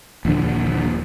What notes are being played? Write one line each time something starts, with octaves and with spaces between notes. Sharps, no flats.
D#1 A#1 D3 F3